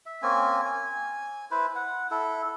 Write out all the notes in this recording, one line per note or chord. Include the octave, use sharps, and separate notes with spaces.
E5
A#3 C4 C#4 G#5
G#5
E4 B4 C5
F#5
E4 A4